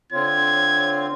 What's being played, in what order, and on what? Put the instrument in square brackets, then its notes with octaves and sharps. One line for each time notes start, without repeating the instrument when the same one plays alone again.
[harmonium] D3 C4 F4 [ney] C#5 [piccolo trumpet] G#6